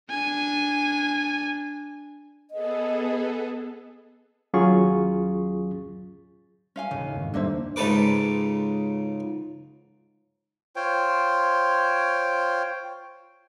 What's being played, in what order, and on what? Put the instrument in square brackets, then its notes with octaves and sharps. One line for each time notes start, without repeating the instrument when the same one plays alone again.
[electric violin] D4 G#5
[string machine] B3 G#4 A4 [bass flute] D#5
[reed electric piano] D#2 F#3 C#4 F4 G#4 C#6
[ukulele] C#4 F5 G#5
[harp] D#2 A2 [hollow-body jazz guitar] C#3
[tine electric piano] F2 G#2 D#3
[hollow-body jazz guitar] D3 A#3 E5 [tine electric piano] G3 D4 C5
[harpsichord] C#2 G#2 C#3 A4 B4 D6
[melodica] F4 C5 C#5 G5